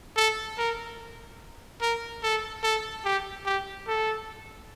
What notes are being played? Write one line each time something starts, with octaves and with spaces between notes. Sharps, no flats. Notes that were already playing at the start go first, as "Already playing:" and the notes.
A4
A#4
A#4
A4
A4
G4
G4
A4